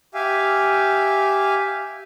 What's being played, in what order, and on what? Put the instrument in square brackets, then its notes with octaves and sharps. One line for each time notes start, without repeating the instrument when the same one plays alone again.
[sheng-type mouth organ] G4 E5 F5 G#5